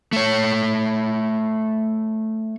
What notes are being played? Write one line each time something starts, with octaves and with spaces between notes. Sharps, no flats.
A3 C#5